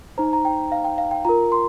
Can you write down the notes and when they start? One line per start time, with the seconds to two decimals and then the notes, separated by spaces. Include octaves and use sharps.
0.18 D#4 C5 A#5
0.33 A#5
0.45 G5
0.72 F5
0.84 G5
0.98 F5
1.11 G5
1.25 F4 A#4 A#5
1.52 C6